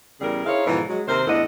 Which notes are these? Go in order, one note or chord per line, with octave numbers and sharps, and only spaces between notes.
E2 C#3 G3 G#4 A#4
D#4 E4 G#4 C5 C#5 F5
G#2 B2 D3 E3 F3
F#3 G#3
D#2 C3 A#4 C5
E2 A2 D4 A4 D#5 F#5